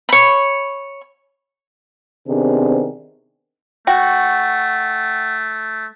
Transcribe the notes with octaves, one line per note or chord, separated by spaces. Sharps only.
C#5 B5
C3 D#3 B3 C4 D4 G#4
A3 F#4 G5